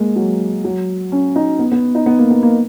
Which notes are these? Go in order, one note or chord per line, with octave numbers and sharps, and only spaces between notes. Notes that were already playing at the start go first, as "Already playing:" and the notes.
Already playing: G#3 A#3
F#3
F#3
C#4
D#4
B3
B3
D#4
B3
A#3
B3
A#3